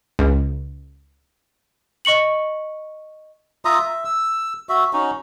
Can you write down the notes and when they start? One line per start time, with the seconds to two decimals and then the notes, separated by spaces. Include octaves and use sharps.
0.19 C#2
2.05 D#5 C#6 C#7 F#7
3.65 F4 E5 A#5 D#6
3.80 E5
4.05 E6
4.69 F#4 E5
4.93 C#4 D#4 F#4